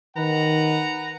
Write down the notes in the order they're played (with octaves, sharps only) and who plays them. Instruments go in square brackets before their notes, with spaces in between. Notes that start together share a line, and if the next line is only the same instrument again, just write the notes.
[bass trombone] D#3 [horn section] B4 F#5 A#5